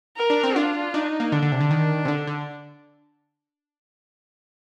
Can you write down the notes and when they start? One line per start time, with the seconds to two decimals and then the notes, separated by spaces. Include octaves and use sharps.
0.17 A#4
0.30 D4
0.44 C4
0.56 D4 F4
0.94 D4 D#4
1.20 A#3
1.32 D3 D4
1.42 D3
1.52 C3
1.60 D3
1.71 D#3
2.05 C3
2.08 D3
2.27 D3